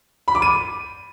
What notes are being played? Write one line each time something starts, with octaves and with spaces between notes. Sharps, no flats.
B5
D6
D#7